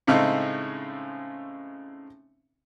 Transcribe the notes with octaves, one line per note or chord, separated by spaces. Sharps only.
A2 C#3 G#3 A3 C4 D#4